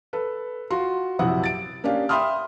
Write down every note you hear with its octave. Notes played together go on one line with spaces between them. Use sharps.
A4 B4
F4 F#4 C6
A#1 F#2 C3 E4 F#5 D#6
A6 D7
A#3 C#4 D4 G4 F5
E5 G5 B5 C6 D#6 F6